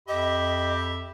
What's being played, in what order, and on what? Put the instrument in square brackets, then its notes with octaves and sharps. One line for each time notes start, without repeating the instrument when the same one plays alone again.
[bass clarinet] F2 [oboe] G4 [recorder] D#5 [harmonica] E5 B5